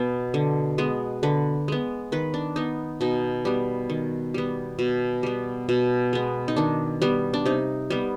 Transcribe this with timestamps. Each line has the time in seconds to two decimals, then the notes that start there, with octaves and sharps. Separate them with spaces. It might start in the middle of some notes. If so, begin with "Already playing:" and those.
Already playing: B2 B3
0.34 D3
0.78 G#3 B3
1.23 D3 B4
1.68 G#3 B3
2.12 D#3 B4
2.34 D4
2.56 B3 D#4
3.01 B2 D#4
3.45 G3 B3
3.90 D#3
4.34 G3 B3
4.79 B2
5.23 G3 B3
5.69 B2
6.13 G#3 B3
6.48 D#4
6.56 D#3 D4
7.02 G3 B3
7.34 D4
7.45 C3 D#4
7.90 G3 B3